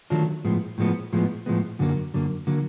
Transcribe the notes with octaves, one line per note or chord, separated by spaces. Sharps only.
D#3 F#3 A3 D4 F4
A2 F3 G#3 B3
A2 F3 G#3 B3
A2 F3 G#3 B3
A2 F3 G#3 B3
F#2 D3 F#3 A#3
F#2 D3 F#3 A#3
D3 F#3 A#3